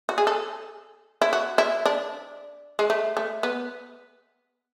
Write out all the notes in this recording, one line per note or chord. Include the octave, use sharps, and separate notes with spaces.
F#4
G#4
A4
E4
F#4
E4
D4
G#3
A3
A3
B3